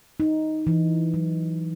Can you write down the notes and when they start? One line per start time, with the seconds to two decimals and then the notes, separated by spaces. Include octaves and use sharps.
0.20 D#4
0.67 E3
1.14 F#3